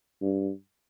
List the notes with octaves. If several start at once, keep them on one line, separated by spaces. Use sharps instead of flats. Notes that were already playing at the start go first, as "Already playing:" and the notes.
G2